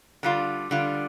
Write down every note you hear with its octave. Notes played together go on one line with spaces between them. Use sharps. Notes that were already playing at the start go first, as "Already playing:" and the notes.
D3 G3 F4
D3 G3 F4